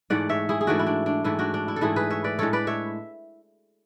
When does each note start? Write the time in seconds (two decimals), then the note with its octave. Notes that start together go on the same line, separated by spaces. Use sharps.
0.10 G#2 E3 A3 D5 F#5
0.29 C#5 E5
0.49 E4 G#4
0.61 G#4
0.67 G#2 E3 A3 D4 F#4
0.79 E4
0.87 D4
1.06 D4
1.24 G#2 E3 A3 E4
1.39 D4 F#4
1.54 D4
1.68 E4
1.76 A4
1.81 G#2 E3 A3 E4 G#4
1.96 G#4 B4
2.10 C#5 E5
2.24 B4 D5
2.39 A2 G#3 D4 A4 C#5
2.53 B4 D5
2.67 C#5 E5